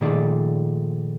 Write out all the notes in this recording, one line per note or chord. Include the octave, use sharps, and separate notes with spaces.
A#2 D#3 F3 A3 G#4 D5